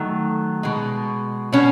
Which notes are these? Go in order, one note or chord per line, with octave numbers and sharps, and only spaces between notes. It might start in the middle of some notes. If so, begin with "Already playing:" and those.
Already playing: D#3 F#3 A3
B2 G#3
B2 C#4